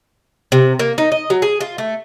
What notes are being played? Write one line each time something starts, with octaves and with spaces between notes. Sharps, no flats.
C3
A#3
D#4
D#5
F#3
G#4
F4
A3